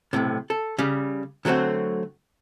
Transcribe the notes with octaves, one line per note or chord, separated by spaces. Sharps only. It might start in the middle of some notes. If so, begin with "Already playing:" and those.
B1 F2 A2 C3
A4
C#3 G3
D3 F#3 A3 C4 F#4